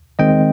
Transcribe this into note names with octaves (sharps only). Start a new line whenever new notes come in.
D#3 G#3 C4 D#5 G5